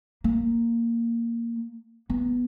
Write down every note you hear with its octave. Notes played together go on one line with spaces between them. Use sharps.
A#3
B3